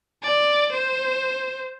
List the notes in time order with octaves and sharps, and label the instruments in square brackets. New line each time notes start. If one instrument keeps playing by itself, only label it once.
[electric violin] D5
C5